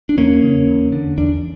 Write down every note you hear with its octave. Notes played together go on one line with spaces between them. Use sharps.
D4
E2 A#3 C#4
C#3
E2
D3
E2 D4